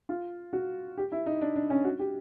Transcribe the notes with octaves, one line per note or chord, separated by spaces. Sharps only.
F4
F#4
G4
E4
D#4
D4
D4
C#4
F#4
G4